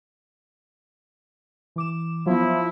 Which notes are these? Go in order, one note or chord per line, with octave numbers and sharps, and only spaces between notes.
E3 D6 E7
F3 F#3 B3 E4